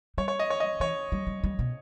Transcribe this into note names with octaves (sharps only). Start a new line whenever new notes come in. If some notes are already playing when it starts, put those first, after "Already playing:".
G3 C#5
C#5
D#5
C#5
D#5
E3 C#5
G3
G3
G3
B2